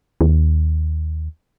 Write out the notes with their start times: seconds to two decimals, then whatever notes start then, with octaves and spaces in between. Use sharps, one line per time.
0.21 D#2